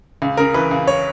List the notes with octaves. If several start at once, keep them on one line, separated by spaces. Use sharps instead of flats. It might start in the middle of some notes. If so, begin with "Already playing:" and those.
C#2
C#3 A#4
E3 B4
C#2
C#5